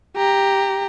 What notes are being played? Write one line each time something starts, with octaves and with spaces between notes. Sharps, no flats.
G4 A#5